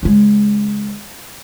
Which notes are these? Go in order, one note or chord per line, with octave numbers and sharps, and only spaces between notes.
C#3 G#3